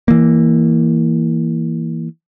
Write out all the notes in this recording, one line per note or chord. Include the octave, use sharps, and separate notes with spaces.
E3 A#3